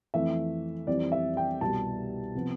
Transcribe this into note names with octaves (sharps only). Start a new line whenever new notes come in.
F2 E3 A3 E5
F2 E3 G3 C4 D5
E5
G5
C2 B2 G3 A5
C3 F3 B3